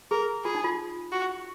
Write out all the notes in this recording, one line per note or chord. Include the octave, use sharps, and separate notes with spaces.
G#4 A#4
F4 G#4
D#4
F4
F#4